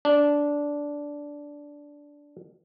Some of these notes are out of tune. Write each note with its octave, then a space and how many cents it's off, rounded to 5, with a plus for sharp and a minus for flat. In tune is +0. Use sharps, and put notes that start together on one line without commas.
D4 -10